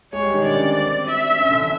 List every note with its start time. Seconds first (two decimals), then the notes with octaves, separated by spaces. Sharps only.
0.13 G#3 G#4 C#5
0.23 G3 G4
0.33 D#3 D#4
0.44 D3 D4 D5
0.54 C#4
0.65 C4
0.75 C4
1.07 E5
1.39 C#4
1.49 D3 D4
1.60 E3 E4